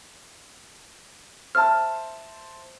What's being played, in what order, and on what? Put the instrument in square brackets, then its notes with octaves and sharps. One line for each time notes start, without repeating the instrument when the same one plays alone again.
[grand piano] C5 E5 A5 [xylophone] F6